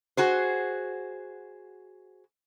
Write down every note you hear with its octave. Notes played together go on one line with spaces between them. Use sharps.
F#4 G#4 C5